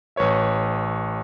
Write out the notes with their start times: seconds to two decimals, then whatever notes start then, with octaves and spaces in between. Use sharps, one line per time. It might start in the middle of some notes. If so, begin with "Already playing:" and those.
0.16 A1 B4 C#5 E5